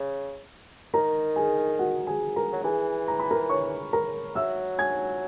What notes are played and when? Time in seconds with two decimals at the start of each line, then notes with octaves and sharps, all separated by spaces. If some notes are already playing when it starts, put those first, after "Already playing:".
Already playing: C#3
0.94 D#3 A#4 A#5
1.36 G#4 G#5
1.79 F#4 F#5
2.07 G#4 G#5
2.36 A#4 A#5
2.53 F#3
2.64 E3 G#4 G#5
3.08 A#5
3.19 B5
3.31 A#4 A#5
3.49 C#5 C#6
3.93 A#4 A#5
4.35 F#3 E5 E6
4.78 G#5 G#6